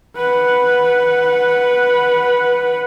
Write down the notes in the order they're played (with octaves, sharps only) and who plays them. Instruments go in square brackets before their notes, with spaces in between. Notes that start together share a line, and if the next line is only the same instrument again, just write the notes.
[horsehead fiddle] B4 F#5